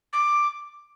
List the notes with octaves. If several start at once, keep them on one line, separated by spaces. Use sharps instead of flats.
D6